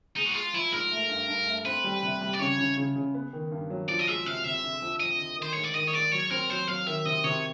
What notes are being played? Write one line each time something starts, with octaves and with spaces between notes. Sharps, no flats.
G#3 D#4
F#4
G#3 F4
F3 E4
G#2 A#4
A3
G2
G2
A3
C4 B4
G3
C3
G3
D5
C#3 C#5
C#3
C#3
C#3
B3
D#3
G2
F#3
F3 D5
D#5
G#3 E5
C3 F5
C3 E5
D3
F2
F2 D#5
D3
D#3 C5
G#2 C#5
D5
D#3 D#5
C#5
G#2 D5
F#3 C#5
C4 A#4
F#3 C5
F#3 F5
D#3 E5
C3 D#5
C3 C#5